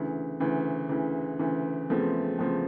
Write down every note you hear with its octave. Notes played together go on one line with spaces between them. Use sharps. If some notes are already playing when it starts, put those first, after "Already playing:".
Already playing: D2 C#3 E3
D2 C#3 E3
D2 C#3 E3
D2 C#3 E3
E2 C#3 F3 A3 C4
E2 C#3 F3 A3 C4